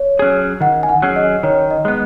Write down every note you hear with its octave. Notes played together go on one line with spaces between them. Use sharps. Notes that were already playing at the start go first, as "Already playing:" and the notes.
Already playing: C#5
F#3 C#4 G#4
D#3 F#5
G#5
F#5
F#3 C#4 G#4
D#5
D#3 C#5
D#5
G#3 B3